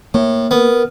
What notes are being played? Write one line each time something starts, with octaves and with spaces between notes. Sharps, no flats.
A2 A#3
B3 A#4